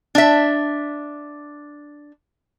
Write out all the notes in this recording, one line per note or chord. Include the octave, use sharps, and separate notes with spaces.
D4 E5